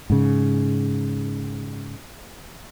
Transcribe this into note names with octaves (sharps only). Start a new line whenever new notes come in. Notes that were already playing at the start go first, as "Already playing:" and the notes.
G#2 C#3